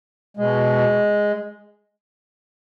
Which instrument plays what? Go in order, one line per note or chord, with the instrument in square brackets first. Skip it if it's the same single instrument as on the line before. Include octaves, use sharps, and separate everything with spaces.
[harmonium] B2 G#3